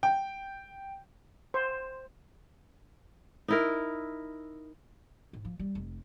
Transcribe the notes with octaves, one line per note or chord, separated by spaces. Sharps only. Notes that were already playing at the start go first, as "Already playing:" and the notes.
G5
C5
D#4 E4 A#4
G#2
F3
G3
F1